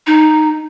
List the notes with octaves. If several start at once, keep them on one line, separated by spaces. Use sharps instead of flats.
D#4